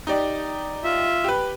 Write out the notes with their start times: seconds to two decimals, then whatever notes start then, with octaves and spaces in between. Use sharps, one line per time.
0.07 D#4 G4 D5
0.84 F4 E5
1.24 G4 B4